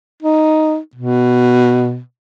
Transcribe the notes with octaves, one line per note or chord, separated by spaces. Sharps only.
D#4
B2